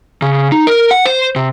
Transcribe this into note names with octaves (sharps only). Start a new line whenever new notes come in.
C#3
D#4
A#4
F#5
C5
C3